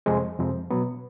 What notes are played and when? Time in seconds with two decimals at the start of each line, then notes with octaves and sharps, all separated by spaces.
0.06 F2 C3 F3 G#3 C4
0.38 F2 C3 F3 G#3 C4
0.70 B2 F#3 B3